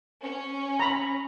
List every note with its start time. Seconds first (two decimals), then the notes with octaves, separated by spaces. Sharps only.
0.23 C#4
0.80 A#5 B5